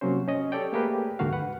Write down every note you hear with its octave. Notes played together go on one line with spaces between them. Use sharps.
C3 F#3 A#3 C#4 C5
C#4 D#5
G4 A4 C#5 D5 G5
A3 A#3 G4 G#4 A#4 B4
D2 G#2 D3 A#3 F#4 F5
B4 F#5